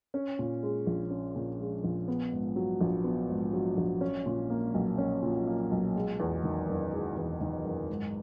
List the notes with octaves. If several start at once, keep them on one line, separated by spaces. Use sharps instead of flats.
C#4
A#2
G#3
A#1
C#4
A#2
G#3
A#1
B3
G#2
F#3
A#1
B3
G#2
F#3
A#1
C#4
A#2
A#3
B1
C#4
A#2
A#3
B1
G#3
E2
D#3
F#1
G#3
E2
D#3
F#1
G#2